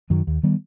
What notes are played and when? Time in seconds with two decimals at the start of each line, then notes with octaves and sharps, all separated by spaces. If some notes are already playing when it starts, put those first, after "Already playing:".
0.10 F#2 D#3 F#3
0.27 D#2
0.43 D#3 G3 B3